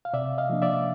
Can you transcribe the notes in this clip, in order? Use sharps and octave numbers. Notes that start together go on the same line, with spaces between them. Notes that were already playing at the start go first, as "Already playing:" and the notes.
F5
C3 D5 E5
D#5 F5
F3 A#3 D4
D5 E5